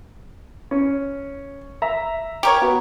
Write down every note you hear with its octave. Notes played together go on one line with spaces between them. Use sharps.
C#4
E5 A#5
G4 A#4 C#5
B3 F#4